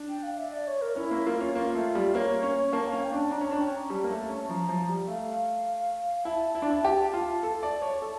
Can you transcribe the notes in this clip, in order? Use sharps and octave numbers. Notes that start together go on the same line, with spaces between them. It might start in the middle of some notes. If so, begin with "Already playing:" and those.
Already playing: D4
G5
F5
E5
D5
C#5
A#4
C#4 E4
A#3
A#3 F4
C#4
A#3 F4
A3
G3
A#3 C#5
C#4
A#3 A5
C#4 F5
G5
D4 A5
D4 A#5
C#4
D4 A5
C#4 G5
A#5
G3 A5
A#3
A3
C#4
F3 A#5
F3
G3
A3 F5
E4 A5
E4
D4
E4
G4
F4
A4
D5
C#5
A4 A5